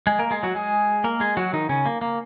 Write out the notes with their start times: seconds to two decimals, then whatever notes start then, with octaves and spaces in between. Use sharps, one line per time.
0.07 G#3 G#4
0.19 A#3 A#4
0.31 G#3 G#4
0.43 F#3 F#4
0.55 G#3 G#4
1.04 A#3 A#4
1.20 G#3 G#4
1.37 F#3 F#4
1.53 D#3 D#4
1.69 C#3 C#4
1.86 A#3
2.01 A#3